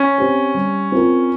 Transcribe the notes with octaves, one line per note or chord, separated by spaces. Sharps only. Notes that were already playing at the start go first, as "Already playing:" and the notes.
Already playing: C#4
C4 G4 C5
G3
C4 F4 A#4